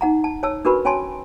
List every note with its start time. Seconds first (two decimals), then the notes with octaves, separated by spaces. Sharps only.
0.01 D#4 F#5 A#5
0.24 A5
0.43 C#5 A5 E6
0.65 D4 F#4 A#4 B4 B5 C#6
0.85 C#4 C#5 G#5 A5 C6